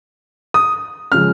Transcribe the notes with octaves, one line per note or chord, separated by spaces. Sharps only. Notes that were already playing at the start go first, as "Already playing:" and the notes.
D#6
C#3 F3 G#3 F6